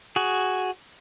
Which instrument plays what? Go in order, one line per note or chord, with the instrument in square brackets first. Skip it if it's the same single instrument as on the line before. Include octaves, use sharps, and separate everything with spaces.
[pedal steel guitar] F#4 G#4